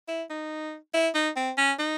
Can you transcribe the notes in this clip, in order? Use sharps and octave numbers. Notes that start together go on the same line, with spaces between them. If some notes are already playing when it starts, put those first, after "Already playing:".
E4
D#4
E4
D#4
C4
C#4
D#4